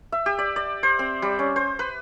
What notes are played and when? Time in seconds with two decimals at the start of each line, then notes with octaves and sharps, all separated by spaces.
0.12 E5
0.26 G4
0.38 D5
0.56 D5
0.83 C5
0.99 C4
1.22 G3
1.39 C#4
1.56 C5
1.79 B4